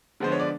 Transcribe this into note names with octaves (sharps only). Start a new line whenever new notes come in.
D3 F3 G#3 B3 C5
C#5
D5